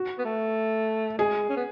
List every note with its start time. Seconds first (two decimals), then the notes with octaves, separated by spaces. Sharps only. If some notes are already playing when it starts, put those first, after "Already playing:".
Already playing: F#4
0.18 B3
0.25 A3
1.18 G#3 G#4
1.49 C#4
1.56 B3